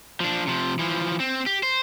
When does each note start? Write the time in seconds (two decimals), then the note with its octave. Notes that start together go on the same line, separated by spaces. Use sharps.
0.20 F3 D4
0.47 C3 F3
0.79 E3 F3
1.20 C4
1.46 G4
1.63 C5